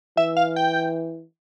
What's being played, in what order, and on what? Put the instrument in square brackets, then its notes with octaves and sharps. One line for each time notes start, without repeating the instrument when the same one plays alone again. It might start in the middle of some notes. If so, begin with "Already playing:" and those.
[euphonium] E3 [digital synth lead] E5
[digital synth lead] F5
G5